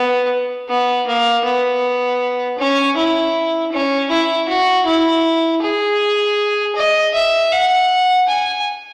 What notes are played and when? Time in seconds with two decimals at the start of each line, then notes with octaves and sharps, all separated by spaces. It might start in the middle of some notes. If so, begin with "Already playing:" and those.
Already playing: B3
0.69 B3
1.07 A#3
1.45 B3
2.58 C#4
2.97 E4
3.72 C#4
4.10 E4
4.49 F#4
4.86 E4
5.62 G#4
6.76 D#5
7.14 E5
7.52 F#5
8.28 G#5